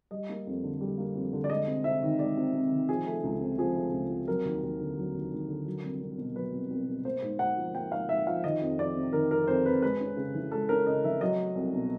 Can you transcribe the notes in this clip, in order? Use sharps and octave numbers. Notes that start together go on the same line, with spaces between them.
G3 D#5
A#3
F2
D3
G3
A#3
F2
D3
D5
G#3 D#5
C3
C3 E5
D#3
G#3 D5
C3
C3
D#3
F3 G#4
A3
C#2
C3
F3 G#4
A3
C#2
C3
F#3 A#4
D#2
D#2
D3
F#3
D#2
D#2
D3
F#3
C2
C2
B2
F#3 B4
C2
C2
B2
A#3 C5
G#2
G#2 F#5
F3
A#3 G5
G#2 F5
G#2 E5
F3 F5
D#3 D#5
F2
F2 D5
C3
D#3 A#4
F2 A#4
F2 C5
C3 B4
G#3 B4
C#4
C#3
E3
G#3 A4
C#4 A#4
C#3 D#5
E3 E5
F#3 D#5
A3
C2
B2